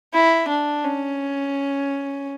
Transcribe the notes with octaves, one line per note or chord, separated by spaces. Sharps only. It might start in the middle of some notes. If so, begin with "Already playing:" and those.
E4
D4
C#4